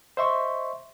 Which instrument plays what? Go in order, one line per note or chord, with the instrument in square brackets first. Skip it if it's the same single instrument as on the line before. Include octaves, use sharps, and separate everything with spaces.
[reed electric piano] C5 D#5 E5 C6 C#6